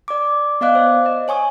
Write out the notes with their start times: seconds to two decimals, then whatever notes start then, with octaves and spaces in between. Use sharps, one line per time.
0.08 D5 D6
0.61 B3 D5 D#5 F5 D6 F#6
0.75 C5
1.06 D#5
1.28 C#5 G#5 C#6 D#6